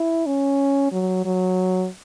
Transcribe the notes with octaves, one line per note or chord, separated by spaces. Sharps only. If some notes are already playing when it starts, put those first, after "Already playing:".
Already playing: E4
C#4
F#3
F#3